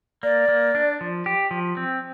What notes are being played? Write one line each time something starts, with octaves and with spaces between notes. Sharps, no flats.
A#3 D5
A#3
D4
F3
G4
F3
C4